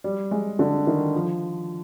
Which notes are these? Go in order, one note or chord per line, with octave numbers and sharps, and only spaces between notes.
G3
G#3
D3
D#3
F3